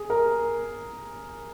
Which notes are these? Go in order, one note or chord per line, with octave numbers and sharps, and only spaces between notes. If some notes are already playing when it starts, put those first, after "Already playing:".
Already playing: G#4
A#4